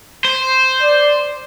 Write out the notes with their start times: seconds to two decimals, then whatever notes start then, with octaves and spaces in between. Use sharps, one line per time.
0.24 C5
0.82 D5